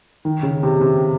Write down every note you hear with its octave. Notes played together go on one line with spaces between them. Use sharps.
D#3
C#3
C3
C3